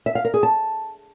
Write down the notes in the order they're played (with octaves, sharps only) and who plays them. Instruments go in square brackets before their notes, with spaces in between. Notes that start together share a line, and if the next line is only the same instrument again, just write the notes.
[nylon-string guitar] E5
F5
A#4
G#4
A5